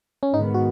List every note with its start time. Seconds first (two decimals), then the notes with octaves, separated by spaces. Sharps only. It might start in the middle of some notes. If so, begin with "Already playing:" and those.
0.23 C#4
0.33 G#2 D#3 B3 D#4
0.54 F#4